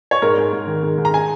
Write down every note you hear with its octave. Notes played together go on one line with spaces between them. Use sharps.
C#5
G#2 A#4
G#2
G#2
D#3
G#2
G#2
A#5
G#5